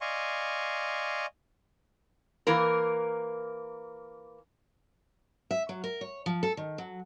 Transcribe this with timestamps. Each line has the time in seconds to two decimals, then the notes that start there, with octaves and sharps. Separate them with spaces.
0.01 D5 D#5 F5 G#5 C6 C#6
2.47 E3 A#3 A#4
5.51 E5
5.69 F#3
5.84 A#4
6.01 C#5
6.26 F3
6.43 A4
6.57 D#3
6.78 F#3